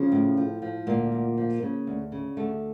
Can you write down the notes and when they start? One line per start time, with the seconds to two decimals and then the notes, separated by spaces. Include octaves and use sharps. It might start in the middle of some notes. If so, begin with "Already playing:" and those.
Already playing: C#3 F3 C#4
0.12 A2
0.37 F3
0.62 F3
0.87 D2 A#2 A#3
1.12 D2
1.38 F3
1.63 C#3
1.87 D2
2.12 C#3
2.37 D2 A3